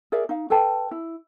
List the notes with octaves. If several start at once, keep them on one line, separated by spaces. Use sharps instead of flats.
G#4 A#4 D5 E5
D#4 F5
A4 B4 G5 A5
E4